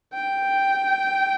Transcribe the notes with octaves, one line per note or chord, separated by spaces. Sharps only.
G5